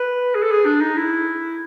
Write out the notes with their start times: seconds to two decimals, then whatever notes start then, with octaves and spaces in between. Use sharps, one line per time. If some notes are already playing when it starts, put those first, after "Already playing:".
Already playing: B4
0.35 G#4
0.43 A4
0.51 G#4
0.65 D4
0.81 D#4
0.96 E4